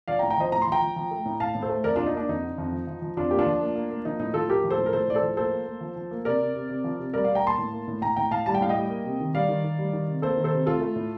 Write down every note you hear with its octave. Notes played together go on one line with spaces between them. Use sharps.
F3 D5 F5
G5 A#5
A2
G5 A#5
F3 C5 D#5
A2 A#5
C6
F3 G5 A#5
F3
F3
A3
A2
A2 F5 A5
A2
A4 C5
A3
F2 A#4 D5
A#3 D4 F4
D#4
A#3 D4
F2 D#4
D3
F2
F3
F3
F3
F2 D4 F4
A#3 G4
D4 F4
F3
A#3
A#3
A#3
F3 D#4
A2 D#4
F3 F4 A4
A2 G4 A#4
F3
A4 C5
A2
A#4
A2 A4 C5
A2 D5
A4 C5
F3
A#3 A4 C5
A#3
A#3
F3
F3
A#3
C3 A#4 D5
C3
C3
C3
F3
C3
G3 A#4 D5
G3 D5 F5
G5 A#5
A#3 A5 C6
A2
A#3
A2
A2 G5 A#5
A2 G5 A#5
A2 F5 A5
G3 A5
G5
A2 F5
D#5 G5
G3
A#3
C3
D#3
G3 D5 F5
D#3
D#3
G3
D#3
C3
A#3 A4 C5
D#3
A4 C5
C3
A3 F4 A4
A3
A2